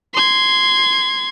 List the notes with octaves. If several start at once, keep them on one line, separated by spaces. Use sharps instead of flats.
C6 G#6